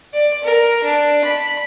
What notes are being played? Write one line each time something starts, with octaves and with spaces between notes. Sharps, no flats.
D5
A#4
D4
B5